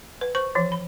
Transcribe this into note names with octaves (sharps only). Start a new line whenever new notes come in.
B4
C5 C#6
E3 F3
B5